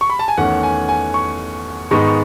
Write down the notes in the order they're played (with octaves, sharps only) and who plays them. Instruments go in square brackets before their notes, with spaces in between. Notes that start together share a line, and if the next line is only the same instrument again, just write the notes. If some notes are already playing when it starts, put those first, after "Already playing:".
[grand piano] C#6
B5
A5
G#5
E2 D#3 A3 C#4 F#5
G#5
G#5
C#6
G#2 D#3 G#3 B3 D#4 C#6
C#6